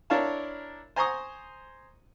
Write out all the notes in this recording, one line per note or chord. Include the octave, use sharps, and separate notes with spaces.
D4 E4 A#4 C#5 F5 A5
C5 G#5 A#5 C6 C#6 D#6